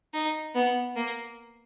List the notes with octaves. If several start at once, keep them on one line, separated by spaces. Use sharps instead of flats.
D#4
B3
A#3